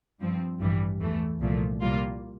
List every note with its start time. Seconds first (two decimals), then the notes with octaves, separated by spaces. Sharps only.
0.20 G2 F3 C4
0.60 A1 G2 E3 G3
1.00 E2 E3 A3
1.40 C2 A#2 F3 A3
1.81 C2 A#2 G3 A#3 F4